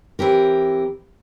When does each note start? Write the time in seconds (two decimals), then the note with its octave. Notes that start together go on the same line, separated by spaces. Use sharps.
0.19 E3 C4 G4 A#4